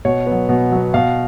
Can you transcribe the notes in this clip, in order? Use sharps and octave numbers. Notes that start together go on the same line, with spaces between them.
B2 C#5
F#3 B3
B2
F#3 B3
B2 F5